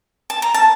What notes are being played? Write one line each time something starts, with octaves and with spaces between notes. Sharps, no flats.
A5
A#5
A5